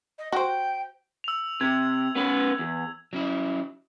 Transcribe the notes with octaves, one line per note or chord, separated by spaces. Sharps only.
D#5
F#4 C5 G5
E6 F7
C3 G#6
B3 C#4 B4
E2
F#3 C#4 E4